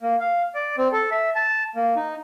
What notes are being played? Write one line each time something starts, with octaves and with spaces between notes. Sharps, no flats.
A#3
F5
D5
C4
A4
E5
A5
A#3
D#4